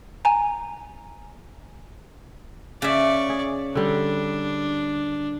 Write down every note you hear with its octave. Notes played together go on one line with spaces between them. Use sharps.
G#5 A#5
C#3 D5 E5 C#6
G#4
D3 G3 D4